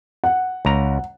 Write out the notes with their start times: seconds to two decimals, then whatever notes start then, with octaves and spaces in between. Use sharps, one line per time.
0.24 F#5
0.65 C#2 A#5